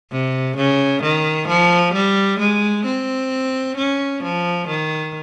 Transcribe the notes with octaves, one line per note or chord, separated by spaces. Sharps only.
C3
C#3
D#3
F3
G3
G#3
C4
C#4
F3
D#3